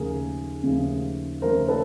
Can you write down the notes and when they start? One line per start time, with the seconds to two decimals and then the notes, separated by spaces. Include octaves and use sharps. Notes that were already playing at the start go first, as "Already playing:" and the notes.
Already playing: D#2 C#3 F3 A3 G#4 A#4
0.63 D#2 C#3 F3 A3
1.41 D#2 C#3 F3 A3 A#4 C5
1.68 A4 B4